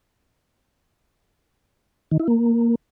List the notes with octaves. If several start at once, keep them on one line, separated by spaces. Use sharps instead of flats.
D#3
E4
A#3